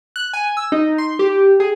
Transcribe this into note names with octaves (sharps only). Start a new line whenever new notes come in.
F#6
G#5
E6
D#4
C6
G4
G#4